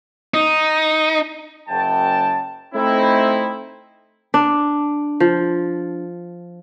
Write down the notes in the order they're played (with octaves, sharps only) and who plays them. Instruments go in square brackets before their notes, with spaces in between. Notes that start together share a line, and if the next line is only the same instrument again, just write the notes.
[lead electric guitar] D#4
[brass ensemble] F#1 F#2 G5 A5
A3 C4 D#4 E4
[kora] D4
F3